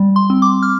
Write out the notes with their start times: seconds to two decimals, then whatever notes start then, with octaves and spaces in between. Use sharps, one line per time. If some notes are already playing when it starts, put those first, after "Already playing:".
Already playing: G3
0.16 C6
0.30 C4
0.42 D6
0.63 F6